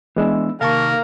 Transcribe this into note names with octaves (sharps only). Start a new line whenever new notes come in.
E3 G#3 B3 D4 E4 E5
C3 D#3 A#3 A#4 F5 A5 C#6